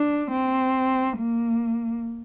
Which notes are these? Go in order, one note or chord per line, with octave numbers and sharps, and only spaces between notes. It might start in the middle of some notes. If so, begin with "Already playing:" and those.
Already playing: D4
C4
A#3